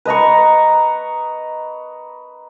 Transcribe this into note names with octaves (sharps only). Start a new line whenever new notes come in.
B4 D#5 A#5 C#6